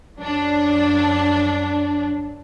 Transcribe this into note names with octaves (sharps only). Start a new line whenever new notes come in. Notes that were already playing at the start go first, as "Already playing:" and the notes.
F#2 F#3 D4